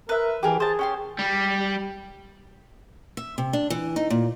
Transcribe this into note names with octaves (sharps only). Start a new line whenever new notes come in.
A#4 B4 E5
E3 G4 G#4 A#4
G#4 C5 A5
C#4 G4 C6
G3
E5
C3
D4
E3
D#4
A#2